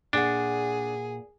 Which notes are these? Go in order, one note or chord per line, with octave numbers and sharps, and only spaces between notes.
A#2 D4 G#4 F#5